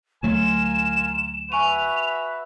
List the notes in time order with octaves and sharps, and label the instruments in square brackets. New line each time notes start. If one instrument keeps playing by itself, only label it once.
[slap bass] D2 F#3 A3 [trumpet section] F4 A#4 G#5 [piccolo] E7
[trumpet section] F#4 B4 E5 [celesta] G#5 C#6 D#7 [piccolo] F7